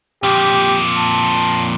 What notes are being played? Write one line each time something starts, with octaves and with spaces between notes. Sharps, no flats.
F2 A#2 G4
A5